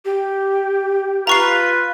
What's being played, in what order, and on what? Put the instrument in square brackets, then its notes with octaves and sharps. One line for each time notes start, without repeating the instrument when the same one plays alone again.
[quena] G4
[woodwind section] F4 B4 [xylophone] A#5 C#6 C7